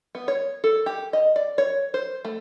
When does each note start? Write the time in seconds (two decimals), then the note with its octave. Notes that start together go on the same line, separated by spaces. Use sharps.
0.15 B3
0.28 C#5
0.64 A4
0.86 G4
1.13 D#5
1.36 D5
1.58 C#5
1.94 C5
2.25 A3